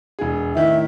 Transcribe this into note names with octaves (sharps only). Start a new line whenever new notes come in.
E1 G#4
A2 D#3 E4 E5